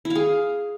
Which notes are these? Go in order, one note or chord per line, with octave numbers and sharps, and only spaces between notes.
E4
F5
G#4